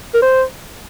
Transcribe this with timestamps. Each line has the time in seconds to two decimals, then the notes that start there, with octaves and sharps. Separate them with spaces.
0.14 A#4
0.22 C5